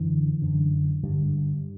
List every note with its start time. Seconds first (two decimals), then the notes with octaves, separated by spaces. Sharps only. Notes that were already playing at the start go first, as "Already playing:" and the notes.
Already playing: F#2 D3 E3
0.42 F#2 D3
1.03 G2 D3 G3